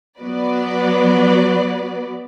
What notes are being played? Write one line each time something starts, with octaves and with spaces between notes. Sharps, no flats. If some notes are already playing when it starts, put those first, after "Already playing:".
F#3 B3 F#4 B4 D5